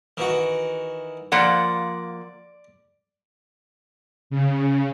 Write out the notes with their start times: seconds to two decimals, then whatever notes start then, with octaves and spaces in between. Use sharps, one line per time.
0.17 D#3 E3 F#4
1.32 F3 A#3 D5 F#5 C6 F6 A6
4.30 C#3